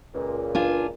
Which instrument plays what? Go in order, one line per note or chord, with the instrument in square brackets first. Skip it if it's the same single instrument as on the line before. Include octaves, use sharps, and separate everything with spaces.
[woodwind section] C#2 A#2
[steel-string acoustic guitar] D4 F4 G#5